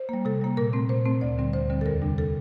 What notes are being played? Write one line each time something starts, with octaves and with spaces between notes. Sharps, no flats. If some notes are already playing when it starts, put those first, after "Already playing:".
Already playing: C5
G3 A#3
C3 A4
G3 A#3
A#2 A#4
A3 C4
A#2 C5
A3 C4
D2 D5
D3 G3 C4
D2 C5
D3 G3 C4
A4
E2 A#4
C3 G3 D4
A4